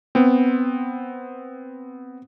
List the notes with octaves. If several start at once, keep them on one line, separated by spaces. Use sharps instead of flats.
B3 C4